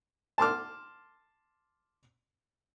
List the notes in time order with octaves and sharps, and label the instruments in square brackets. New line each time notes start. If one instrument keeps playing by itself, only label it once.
[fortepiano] A5 C6 D6 F6